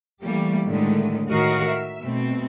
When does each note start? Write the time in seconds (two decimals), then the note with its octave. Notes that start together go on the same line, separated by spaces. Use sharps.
0.22 E3 G3 A3 A#3 G4
0.66 A2 D3 D#3 G#3 A3
1.29 A2 D#3 F#4 A#4 D#5 F5
1.64 E5
2.02 B2 A3 C4